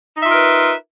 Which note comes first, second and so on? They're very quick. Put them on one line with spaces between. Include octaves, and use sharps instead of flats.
D#4 E5 F4 A#4 B4